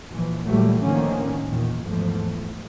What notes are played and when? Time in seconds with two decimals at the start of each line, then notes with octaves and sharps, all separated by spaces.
0.10 A#2 E3 F3
0.48 A#2 E3 F#3 G3 A3
0.83 A2 D3 D#3 F3 A#3 C#4
1.47 E2 A#2 D#3
1.83 E2 G#2 F3 A3